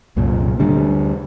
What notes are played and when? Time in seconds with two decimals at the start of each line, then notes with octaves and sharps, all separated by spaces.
0.16 C2 F#2 A#2
0.59 D2 D3 G3 D4